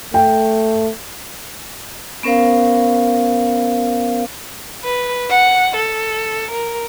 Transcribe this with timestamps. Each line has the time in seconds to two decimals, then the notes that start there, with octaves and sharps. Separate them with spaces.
0.14 A3 G5
2.23 B3 C#4 A#4 C5 F5
4.84 B4
5.30 F#5
5.76 A4
6.51 A#4